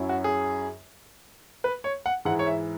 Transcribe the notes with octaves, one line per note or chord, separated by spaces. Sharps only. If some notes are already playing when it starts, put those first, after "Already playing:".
Already playing: F#2 F#3 C#4 E4
F#4
G#4
B4
C#5
F#5
G#2 E3 G#3 E4 F#5
C#5
E5